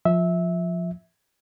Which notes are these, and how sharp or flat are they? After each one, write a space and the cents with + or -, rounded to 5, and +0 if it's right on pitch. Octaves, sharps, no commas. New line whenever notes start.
F3 +10 E5 -15